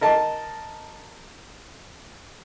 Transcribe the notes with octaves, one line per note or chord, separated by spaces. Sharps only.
A#4 D#5 A5